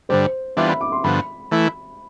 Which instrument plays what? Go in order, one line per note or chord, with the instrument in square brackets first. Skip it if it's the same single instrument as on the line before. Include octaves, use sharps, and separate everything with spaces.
[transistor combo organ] G2 D3 G3 [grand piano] C5
[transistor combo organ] E3 G3 B3 D4 F4 [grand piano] E5
[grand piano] B5
D6
C6
[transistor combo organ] G2 D3 F3 B3 [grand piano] B5
[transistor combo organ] E3 A3 E4